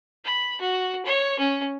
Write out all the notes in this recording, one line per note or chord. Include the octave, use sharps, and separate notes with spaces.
B5
F#4
C#5
C#4